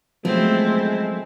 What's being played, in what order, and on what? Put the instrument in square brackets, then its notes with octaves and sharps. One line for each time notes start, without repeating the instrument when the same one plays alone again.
[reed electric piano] F3 F#3 B3 [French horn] G#3 [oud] A3 [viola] C4 E4